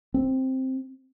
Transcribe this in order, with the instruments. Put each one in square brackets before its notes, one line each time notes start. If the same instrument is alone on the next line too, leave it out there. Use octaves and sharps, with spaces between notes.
[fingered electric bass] C4